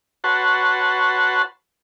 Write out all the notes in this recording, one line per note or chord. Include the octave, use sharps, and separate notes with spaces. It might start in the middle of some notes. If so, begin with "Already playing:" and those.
F#4 B4 C#5 F#5 A5 C6